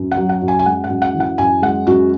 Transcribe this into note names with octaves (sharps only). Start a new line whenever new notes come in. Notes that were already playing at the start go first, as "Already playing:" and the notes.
Already playing: F#2
F#5
F#3
F#5
F#2
G#5
G#5
G#3 F#5
F#5
F#2
F#5
E3
F#5
F#2 G#5
G#3 F#5
F#2 F#4